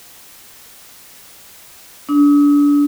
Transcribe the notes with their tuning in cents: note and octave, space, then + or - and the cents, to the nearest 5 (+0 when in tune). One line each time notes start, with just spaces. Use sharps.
D4 -25 D#6 +45